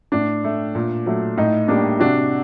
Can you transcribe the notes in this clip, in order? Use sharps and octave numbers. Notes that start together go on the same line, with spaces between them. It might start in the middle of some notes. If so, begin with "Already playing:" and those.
A2 D4
A3
A#2
F#3 A3
A2 D#4
G3 A#3 D4
C3 D4 F#4